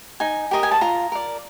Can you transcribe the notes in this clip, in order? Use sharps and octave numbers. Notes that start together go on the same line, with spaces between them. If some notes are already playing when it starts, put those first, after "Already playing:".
D#4 G#5
G4 A#4 D#5
G#5
A5
F4 A#5
A#4 D5